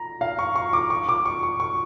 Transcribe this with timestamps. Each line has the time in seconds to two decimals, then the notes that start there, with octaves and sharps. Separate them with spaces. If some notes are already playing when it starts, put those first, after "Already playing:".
Already playing: A#5
0.21 F5
0.39 C#6
0.56 C#6
0.73 D6
0.90 C#6
1.09 D6
1.25 C#6
1.43 C#6
1.60 C#6